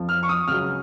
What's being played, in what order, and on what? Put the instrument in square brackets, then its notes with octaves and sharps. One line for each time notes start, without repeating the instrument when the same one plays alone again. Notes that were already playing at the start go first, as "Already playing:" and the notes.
Already playing: [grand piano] F2 F3
F6
C#6
D#6
C#2 C#3 F#3 F6